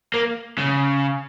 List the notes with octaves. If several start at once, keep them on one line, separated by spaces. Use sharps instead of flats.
A#3
C#3